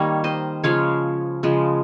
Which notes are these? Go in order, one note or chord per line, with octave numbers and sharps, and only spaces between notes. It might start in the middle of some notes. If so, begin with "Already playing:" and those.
Already playing: D#3 G3 A#3 A#4 C#5
C5 D#5
C#3 F3 G#3 C#5 F5
C#3 F3 G#3